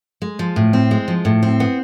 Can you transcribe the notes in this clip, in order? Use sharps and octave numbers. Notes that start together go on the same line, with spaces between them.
G#3
F3
A2
C4
G#3
F3
A2
C4
B3